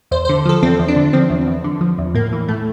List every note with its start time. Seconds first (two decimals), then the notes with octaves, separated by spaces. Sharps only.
0.11 E2 C5
0.25 C5
0.29 D3
0.45 F3 A4
0.63 E2 C4
0.80 E2
0.88 D4
0.96 D3
1.13 F3 C4
1.30 E2
1.47 E2
1.64 D3
1.81 F3
1.98 E2
2.14 A2 A#3
2.33 E3
2.48 A2 A3